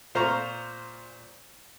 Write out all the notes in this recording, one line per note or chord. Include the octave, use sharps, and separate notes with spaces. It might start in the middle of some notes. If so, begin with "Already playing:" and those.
A#2 C5 F5 A#5 C#6